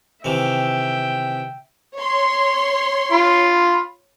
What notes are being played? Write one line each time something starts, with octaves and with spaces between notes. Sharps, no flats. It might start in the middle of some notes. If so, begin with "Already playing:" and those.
C3 D#3 E3 E5 G5
C#5 C6
F4 B5